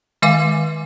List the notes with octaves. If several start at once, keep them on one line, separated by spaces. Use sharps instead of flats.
D#3 G#3 E5 F5 G#5 D6